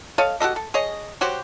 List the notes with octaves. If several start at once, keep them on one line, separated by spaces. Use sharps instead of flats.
A4 C#5 D#5 F5
F#4 G4 A4 D#5
A4
G#4 C#5 D#5
F#3 F#4 G4 C5